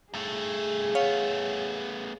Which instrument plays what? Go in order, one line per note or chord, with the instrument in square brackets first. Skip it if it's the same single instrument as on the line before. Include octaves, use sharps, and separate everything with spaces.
[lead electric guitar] G2 A3 [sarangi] G#4
[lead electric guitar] A3 B3 [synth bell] C#5 F5